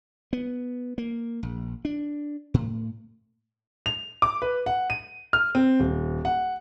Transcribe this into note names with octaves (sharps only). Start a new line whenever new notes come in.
B3
A#3
A#1
D4
A2
F7
D6
B4
F#5
D#7
F6
C4
D#1
F#5